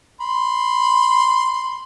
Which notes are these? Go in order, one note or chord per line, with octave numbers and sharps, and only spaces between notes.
B5 C6